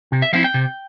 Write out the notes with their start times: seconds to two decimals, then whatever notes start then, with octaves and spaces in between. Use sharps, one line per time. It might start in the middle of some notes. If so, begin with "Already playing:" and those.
0.12 C3
0.22 E5
0.33 F3 C4 E4 F5
0.44 G5
0.54 C3